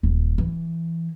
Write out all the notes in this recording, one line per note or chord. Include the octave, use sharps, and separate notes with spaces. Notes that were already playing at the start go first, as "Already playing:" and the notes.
D#1
E3